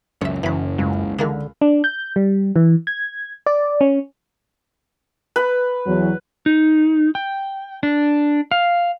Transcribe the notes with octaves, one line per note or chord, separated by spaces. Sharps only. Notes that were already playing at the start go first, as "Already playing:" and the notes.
C#2 F#2 C#5 E5
F#1 F#2 E3 B5
C#2 F#2
D3 D#3 A#3 G#4
D4
G6
G3
E3
G#6
D5
C#4
B4
E2 F#3
D#4
G5
D4
F5